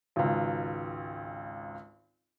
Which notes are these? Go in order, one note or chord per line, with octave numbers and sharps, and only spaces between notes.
G#1 C#2